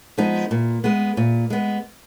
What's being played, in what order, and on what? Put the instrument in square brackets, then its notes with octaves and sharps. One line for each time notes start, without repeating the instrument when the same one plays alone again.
[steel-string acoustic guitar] F3 G#3 B3 D#4
A#2
G#3 B3
A#2
G#3 B3